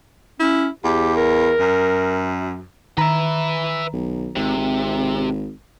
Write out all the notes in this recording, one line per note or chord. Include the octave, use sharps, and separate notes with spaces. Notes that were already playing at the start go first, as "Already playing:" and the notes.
C#4 E4
E2 G4
A#4
F#2
D#3 B4 E5 A#5
B1
G#1 C3
G#1